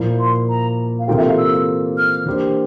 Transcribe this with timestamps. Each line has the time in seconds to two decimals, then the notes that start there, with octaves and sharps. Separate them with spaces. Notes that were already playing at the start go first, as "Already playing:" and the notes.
Already playing: A#2 F3 A#3 E4
0.19 C6
0.49 A#5
0.99 F5
1.08 C3 E3 A#3 F4 A4 G5
1.17 E5
1.27 F5
1.38 E6
1.97 F6
2.26 E3 A#3 D4 G4 C5